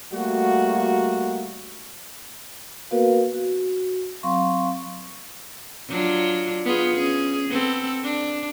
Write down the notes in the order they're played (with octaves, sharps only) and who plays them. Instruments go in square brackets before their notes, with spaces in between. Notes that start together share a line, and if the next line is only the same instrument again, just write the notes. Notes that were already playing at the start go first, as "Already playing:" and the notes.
[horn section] G3 A3 A#3 F#4
[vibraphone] A#3 B3 F#4 A#4 B4 F5
F#4
F#3 C4 F5 C6 C#6
[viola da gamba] F#3 D4 F4
B3 F4 G#4
C#4 G#4
B3 C4 A4
D4